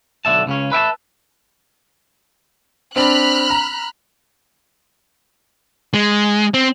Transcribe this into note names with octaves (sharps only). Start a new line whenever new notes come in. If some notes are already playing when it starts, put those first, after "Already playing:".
B1 D3 E5 A5
C#2 C#3 C#4
B4 E5 G5 A5
C4 D4 B5 F6 F#6
A#5
G#3
C4